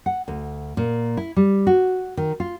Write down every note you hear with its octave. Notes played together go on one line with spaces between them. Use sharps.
F#5
D2
A#2
E4
G3
F#4
D#3
F4